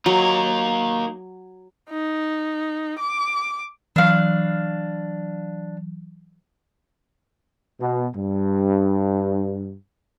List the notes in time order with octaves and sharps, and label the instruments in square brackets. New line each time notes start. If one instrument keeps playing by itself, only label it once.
[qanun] F#3 [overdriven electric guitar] A#3 D#4
[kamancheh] D#4
D6
[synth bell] E3 F#3 [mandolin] D4 F5
[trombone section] B2
G2